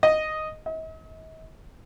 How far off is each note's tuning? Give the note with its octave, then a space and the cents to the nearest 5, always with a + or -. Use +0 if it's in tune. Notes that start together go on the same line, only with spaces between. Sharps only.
D#5 +0
D#5 +45